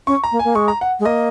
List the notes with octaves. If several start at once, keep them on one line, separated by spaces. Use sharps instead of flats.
C#4 C#6
A#5
A#3
G#5
A#3
G#3 C#6
A#5
F#5
G#3
A#3 D#5